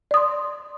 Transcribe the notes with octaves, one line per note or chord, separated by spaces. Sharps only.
D5 C6 D#6